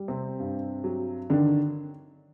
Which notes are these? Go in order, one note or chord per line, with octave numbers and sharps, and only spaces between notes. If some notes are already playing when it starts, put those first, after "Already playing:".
Already playing: G3
C3 C4
G2
F#3
D3 D#3 D4